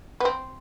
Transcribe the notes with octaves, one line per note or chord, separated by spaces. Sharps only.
B3
C4